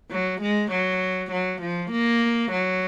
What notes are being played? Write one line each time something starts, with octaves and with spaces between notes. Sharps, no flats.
F#3
G#3
F#3
F#3
F3
A#3
F#3